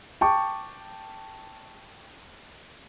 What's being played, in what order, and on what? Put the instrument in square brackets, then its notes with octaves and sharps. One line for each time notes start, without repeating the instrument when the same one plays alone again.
[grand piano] G5 A5 C#6 D6